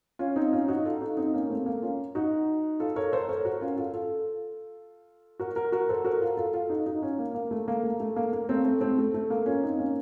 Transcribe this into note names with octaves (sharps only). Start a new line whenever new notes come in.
C#4 F4
C4 D#4
C#4 F4
D#4 F#4
F4 A4
D#4 F#4
C4 D#4
A#3 C#4
A3 C4
A#3
C#4 F4
D#4 F#4
F4 A4
A#4 C#5
A4 C5
A#4 C#5
F#4 A#4
C#4 F4
F4 A4
F4 A4
F#4 A#4
F#4 A#4
F#4 A#4
A4 C5
F#4 A#4
F4 A4
F4 A4
F4 A4
D#4 F#4
D#4 F#4
C#4 F4
A#3
A#3
A3
A#3
A3
A3
A#3
A#3
A3 C4
A3 C4
A3 C4
A3
A3
A#3
C#4 F4
C4 D#4
A#3 C#4